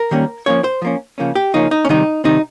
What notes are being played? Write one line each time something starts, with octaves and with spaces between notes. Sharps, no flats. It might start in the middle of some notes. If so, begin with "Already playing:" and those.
Already playing: A#4
D#3 G3 A#3 C#4
F3 A#3 C#4 C#5
C5
F3 A#3 C#4
C#3 F3 A#3 C#4
G4
C#3 F3 A#3 C#4 D#4
D#4
C#4
C3 D#3 G3 C4 D#4
C3 D#3 G3 C4 D#4